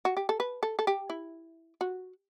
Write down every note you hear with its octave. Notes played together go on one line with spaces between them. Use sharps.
F#4
G4
A4
B4
A4
A4
G4
E4
F#4